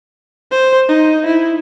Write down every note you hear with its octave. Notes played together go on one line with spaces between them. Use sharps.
C5
D#4
E4